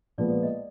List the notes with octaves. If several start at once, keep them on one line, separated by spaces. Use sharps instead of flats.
A#2 F3 G#3 B3 D5
D5
D#5